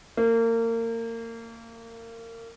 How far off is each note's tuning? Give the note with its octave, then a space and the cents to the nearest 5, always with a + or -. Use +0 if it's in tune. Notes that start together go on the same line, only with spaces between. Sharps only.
A#3 -30